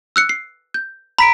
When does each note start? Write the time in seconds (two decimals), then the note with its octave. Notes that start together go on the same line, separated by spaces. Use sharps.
0.16 E6 F#6 C#7
0.29 C7
0.74 G6
1.18 A#5 B5 B6 D7